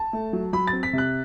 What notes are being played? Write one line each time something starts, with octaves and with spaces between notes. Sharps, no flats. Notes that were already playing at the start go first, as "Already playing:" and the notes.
Already playing: A5
A3
F#3
F#3 B5
A6
C4
B6
C3 F#6